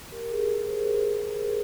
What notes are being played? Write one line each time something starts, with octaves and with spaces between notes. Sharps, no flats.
G4 A#4
G#4
G4 A#4
G#4 C5